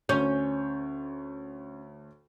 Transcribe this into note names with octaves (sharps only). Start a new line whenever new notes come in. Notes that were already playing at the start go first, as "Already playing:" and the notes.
D2 C#4 C#5 G6